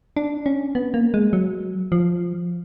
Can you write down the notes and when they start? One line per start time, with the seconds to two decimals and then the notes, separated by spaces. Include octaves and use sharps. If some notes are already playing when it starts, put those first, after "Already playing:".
0.17 D4
0.46 C#4
0.75 B3
0.94 A#3
1.14 G#3
1.33 F#3
1.92 F3